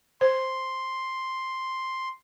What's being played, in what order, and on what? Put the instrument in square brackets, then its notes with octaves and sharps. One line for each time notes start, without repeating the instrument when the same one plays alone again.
[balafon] C5 [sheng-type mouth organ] C6